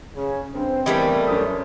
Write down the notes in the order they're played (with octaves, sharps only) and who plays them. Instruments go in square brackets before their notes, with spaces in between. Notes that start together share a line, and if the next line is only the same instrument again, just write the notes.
[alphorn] C#3 [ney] C#4
[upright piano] G2 [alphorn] C4 [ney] C5
[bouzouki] E3 G3 A3 [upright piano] B3 G4 D#5 [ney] A#4
[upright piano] F#2 D#6